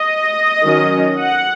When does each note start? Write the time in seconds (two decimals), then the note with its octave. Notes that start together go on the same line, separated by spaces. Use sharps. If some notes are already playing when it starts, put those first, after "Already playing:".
Already playing: D#5
0.63 D#3 F#3 C#4
1.19 F#5